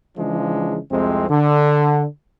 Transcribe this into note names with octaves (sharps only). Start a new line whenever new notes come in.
C#3 E3 F3 G#3 D4
C2 F2 C3 G#3 C4
D3